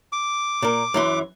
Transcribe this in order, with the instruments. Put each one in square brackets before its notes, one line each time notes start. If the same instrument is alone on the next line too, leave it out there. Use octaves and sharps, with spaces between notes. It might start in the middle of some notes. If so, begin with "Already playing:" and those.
[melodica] D6
[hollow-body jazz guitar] A#2 A#4
F#2 E3 C6